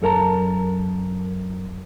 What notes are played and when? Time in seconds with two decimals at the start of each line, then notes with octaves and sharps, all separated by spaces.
0.02 F#2 A4 A#4 A5 A#5